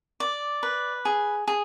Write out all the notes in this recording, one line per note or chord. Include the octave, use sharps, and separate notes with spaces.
D5
B4
G#4
G#4